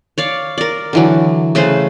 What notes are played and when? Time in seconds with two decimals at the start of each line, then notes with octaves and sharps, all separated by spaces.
0.18 C#5 D5 F5
0.58 A#4 D5
0.93 D3 E3 F#3
1.55 C#3 A3 B4 C5